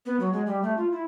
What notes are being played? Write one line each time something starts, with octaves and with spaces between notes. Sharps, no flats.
B3
F#3
G#3
G3
A3
F4
E4